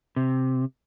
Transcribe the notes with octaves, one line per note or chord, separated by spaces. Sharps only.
C3